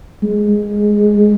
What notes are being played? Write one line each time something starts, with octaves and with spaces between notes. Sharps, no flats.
G#3